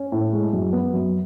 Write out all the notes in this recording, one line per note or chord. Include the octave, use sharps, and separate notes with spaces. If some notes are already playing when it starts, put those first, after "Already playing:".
Already playing: C#4
A2
G#3
F#2
B3
F#2